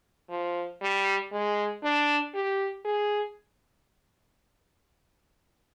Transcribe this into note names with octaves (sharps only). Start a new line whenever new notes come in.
F3
G3
G#3
D4
G4
G#4